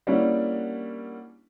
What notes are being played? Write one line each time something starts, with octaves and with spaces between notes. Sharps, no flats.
G3 A#3 C#4 D4 E4 F#4